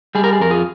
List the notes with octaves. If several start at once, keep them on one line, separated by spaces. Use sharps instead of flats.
G3 G#4
A#4
G#4
F2 A#4
F4 G#4